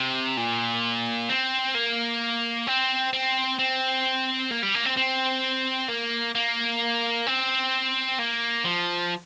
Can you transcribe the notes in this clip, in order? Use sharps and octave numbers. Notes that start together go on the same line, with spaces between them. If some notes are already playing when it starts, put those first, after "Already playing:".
Already playing: C3
A#2
C4
A#3
C4
C4
C4
A#3
G3
A#3
C4
C4
A#3
A#3
C4
A#3
F3